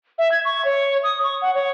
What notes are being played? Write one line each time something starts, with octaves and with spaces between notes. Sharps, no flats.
E5
G#6
C#6
C#5
D#6
C#6
F#5
C#5